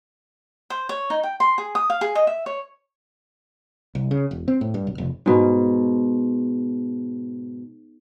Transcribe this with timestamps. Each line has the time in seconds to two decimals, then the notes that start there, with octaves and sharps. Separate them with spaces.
0.70 C5
0.89 C#5
1.10 D#4
1.23 G5
1.40 C6
1.58 G#4
1.75 D#6
1.90 F5
2.01 G#4
2.15 D#5
2.27 E5
2.46 C#5
3.95 C2
4.11 C#3
4.31 E1
4.48 C4
4.61 A2
4.74 G2
4.87 B1
4.98 F1
5.26 G#2 B2